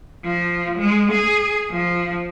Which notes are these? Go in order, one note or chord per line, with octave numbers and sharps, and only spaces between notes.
F3
G#3
G#4
F3